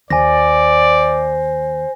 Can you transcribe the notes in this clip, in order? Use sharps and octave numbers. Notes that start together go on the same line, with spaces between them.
D#2 C5 D5 G#5 A#6